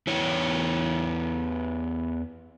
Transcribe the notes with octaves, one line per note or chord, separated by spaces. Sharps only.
E2 E4 C#5